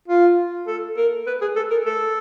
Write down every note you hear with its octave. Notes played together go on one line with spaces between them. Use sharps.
F4
A4
A#4
B4
G#4
A4
A#4
A4